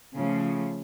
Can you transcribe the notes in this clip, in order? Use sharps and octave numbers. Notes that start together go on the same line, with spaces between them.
C#3 F3 A3